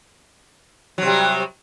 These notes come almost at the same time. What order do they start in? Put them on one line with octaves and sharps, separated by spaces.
F#3 C3 G3